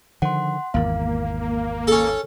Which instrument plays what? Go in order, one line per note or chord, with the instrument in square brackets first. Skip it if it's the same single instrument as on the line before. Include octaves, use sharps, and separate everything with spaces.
[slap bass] D3 D#3 F3 [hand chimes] F#5 C6
[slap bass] G#1 E2 [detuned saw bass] A#3 [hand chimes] F5
[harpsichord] C#4 A4